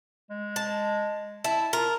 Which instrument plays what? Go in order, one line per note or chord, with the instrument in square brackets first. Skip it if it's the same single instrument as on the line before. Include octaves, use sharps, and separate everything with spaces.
[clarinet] G#3
[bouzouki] A5
[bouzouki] E4 [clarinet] A5
[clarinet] F4 [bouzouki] A#4